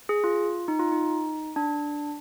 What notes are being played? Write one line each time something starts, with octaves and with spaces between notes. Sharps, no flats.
G#4
F4
D#4
F4
D#4
D4